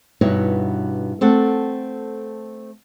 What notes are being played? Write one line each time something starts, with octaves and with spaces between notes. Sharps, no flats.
G2 B2 B3 D#4 E4 C#5
A3 C4 A4 F#5